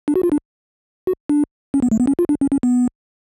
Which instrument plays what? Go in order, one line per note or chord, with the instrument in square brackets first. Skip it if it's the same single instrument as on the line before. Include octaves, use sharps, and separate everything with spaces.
[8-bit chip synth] D4
F#4
F4
D4
F#4
D4
C#4
B3
A3
B3
C#4
F4
D4
C#4
C#4
B3